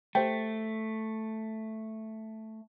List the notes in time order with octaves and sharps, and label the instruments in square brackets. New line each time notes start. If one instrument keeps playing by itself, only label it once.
[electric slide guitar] A3 [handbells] G4 C5 G5